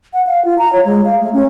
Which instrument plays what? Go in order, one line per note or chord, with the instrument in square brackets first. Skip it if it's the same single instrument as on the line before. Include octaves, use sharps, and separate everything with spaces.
[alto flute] F#5
F5
F4
A#5
C#5
G#3
F5
A3
C#4